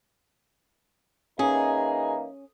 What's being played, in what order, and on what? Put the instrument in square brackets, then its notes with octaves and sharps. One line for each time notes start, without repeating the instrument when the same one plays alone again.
[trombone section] E3 A#3 D#4 [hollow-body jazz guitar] C#4 [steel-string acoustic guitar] G#4